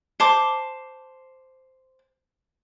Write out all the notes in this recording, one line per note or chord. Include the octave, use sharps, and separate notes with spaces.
C5 A5 D6